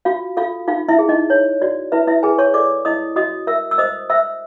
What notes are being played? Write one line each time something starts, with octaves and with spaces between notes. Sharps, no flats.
F4 F#4 F5
F4 A4 F5
D#4 F4 F5
E4 E5
G#4
D#4 D#5
D#4 C#5
F#4 D5
E4 B4 E5
E4 E5
G#4 B4 G#5
C#5 C#6
A4 D5 D6
E4 D#5 D#6
F#4 D#5 D#6
A#4 E5 E6
E6
C5 D#5 D#6
C5 E5 E6